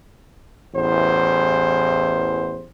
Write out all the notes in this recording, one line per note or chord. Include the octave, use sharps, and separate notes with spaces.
A1 E2 C5